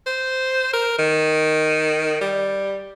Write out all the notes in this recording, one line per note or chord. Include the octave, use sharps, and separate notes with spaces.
C5
A#4
D#3
G3